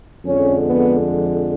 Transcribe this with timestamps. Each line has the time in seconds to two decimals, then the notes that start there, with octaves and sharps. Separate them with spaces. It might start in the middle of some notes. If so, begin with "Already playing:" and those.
0.25 F2 D3 F3 G#3 C#4
0.67 B3